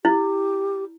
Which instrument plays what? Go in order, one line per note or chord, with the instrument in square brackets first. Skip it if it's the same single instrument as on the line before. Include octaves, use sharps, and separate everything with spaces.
[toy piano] E4 [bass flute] G4